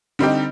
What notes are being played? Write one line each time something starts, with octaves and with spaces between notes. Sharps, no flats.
D3 G3 C4 D#4 G4